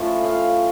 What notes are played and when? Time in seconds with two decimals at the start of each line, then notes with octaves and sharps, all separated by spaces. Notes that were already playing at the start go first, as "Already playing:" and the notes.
Already playing: A2 F3 C#4 F4 E5
0.24 F5